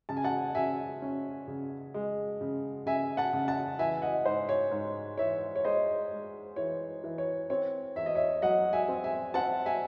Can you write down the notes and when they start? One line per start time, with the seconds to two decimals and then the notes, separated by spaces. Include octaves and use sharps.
0.09 C#3 A5
0.17 G#5
0.24 F#5 A5
0.55 C#3 E5 G#5
1.02 C#4
1.48 C#3
1.94 G#3
2.41 C#3
2.86 C#3 E5 G#5
3.17 F#5 A5
3.33 C#3
3.48 F#5 A5
3.79 E3 E5 G#5
4.02 D#5 F#5
4.25 G#2 C5
4.49 C#5
4.71 G#2
5.18 E3 C#5 E5
5.56 C#5
5.64 G#3 C5 D#5
6.11 G#3
6.56 E3 C#5
7.04 E3
7.18 C#5
7.50 C4 C#5
7.95 E2 E5
8.06 D#5
8.15 C#5 E5
8.42 F#3 D#5 F#5
8.73 E5 G#5
8.88 C4
9.04 E5 G#5
9.34 C4 F#5 A5
9.66 E5 G#5